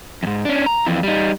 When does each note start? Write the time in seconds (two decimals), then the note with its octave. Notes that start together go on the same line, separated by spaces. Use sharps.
0.23 F2 G#2
0.45 C#4 D4
0.66 A#5
0.86 F2 E3
1.03 G3 D#4